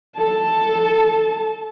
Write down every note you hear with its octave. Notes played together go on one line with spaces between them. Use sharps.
A4 A5